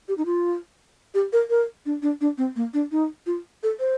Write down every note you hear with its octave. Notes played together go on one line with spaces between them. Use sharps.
G4
D#4
F4
G4
A#4
A#4
D4
D4
D4
C4
A#3
D4
D#4
F4
A4
C5